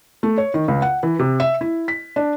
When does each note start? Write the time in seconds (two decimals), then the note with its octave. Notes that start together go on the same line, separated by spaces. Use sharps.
0.23 A3
0.38 C#5
0.54 D#3
0.68 C#2
0.82 F#5
1.03 E3
1.19 C3
1.40 E5
1.61 E4
1.88 B6
2.16 D4